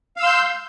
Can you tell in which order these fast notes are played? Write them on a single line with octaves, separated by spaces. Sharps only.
F5 E6 C6 G6